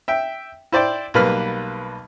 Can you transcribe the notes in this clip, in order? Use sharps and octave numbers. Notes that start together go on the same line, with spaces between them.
E5 G5
E4 C5 D5 G5
B1 G3 A#3 B4 B5 F6